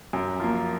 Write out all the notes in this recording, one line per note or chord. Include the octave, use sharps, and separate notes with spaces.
F#2
F3 A#3